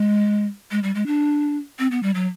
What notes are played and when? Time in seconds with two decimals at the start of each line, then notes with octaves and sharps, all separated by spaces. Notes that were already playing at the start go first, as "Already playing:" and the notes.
Already playing: G#3
0.71 G#3
0.83 G3
0.95 G#3
1.07 D4
1.79 C4
1.91 B3
2.03 G3
2.15 F#3